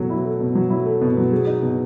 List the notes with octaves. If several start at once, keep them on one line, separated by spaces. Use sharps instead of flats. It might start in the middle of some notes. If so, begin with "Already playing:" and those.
Already playing: B2 F#3 A3
E4
A3
B2
F#3
E4
A3
B2
F#3
G#4
D#4
B2